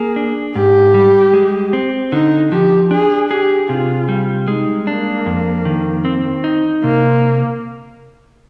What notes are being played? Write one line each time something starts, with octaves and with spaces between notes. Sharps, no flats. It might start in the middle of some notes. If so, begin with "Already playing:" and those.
Already playing: A#3 G#4
D4
G#2 G4
G3
G#3
C4
D3 D#4
F3 G4
D4 G#4
G4 G#4
C3 F4
G3
G#3 D#4
A#3 D4
F2
D#3
C4
D#4
C3 A#3